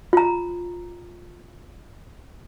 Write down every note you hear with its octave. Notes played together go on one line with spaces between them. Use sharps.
F4 A#5